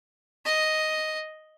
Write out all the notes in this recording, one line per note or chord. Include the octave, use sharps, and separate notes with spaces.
D#5